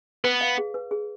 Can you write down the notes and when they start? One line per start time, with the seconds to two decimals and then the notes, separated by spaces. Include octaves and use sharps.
0.24 B3 B4
0.41 F5
0.58 G#4
0.74 B4
0.91 G#4